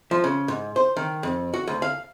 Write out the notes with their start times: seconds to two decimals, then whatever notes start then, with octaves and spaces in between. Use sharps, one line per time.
0.11 F3
0.24 C#3
0.48 G#2
0.76 C5
0.97 D#3
1.23 F2
1.54 F#4
1.67 D2
1.82 F5